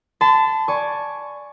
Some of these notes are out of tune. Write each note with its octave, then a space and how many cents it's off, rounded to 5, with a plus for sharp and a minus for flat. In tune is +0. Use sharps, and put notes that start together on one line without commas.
A5 +0 C6 -45
D5 +0 G#5 +10 C#6 +0